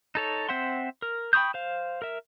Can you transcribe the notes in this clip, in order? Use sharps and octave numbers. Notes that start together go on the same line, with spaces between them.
D#4 A4 C#5
C4 C5 E5 F#5 C6
A#4
G5 B5 C#6 D#6 G6
C5 F5
A#4 E5